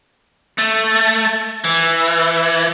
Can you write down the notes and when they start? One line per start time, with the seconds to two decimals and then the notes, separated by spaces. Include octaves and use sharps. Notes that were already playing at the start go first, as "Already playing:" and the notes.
0.58 A3
1.65 E3